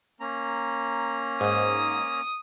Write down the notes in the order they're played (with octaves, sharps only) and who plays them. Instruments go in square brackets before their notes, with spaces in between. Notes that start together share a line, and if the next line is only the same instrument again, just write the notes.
[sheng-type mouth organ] A#3 C#4 A#5
[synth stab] G#2 [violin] D#6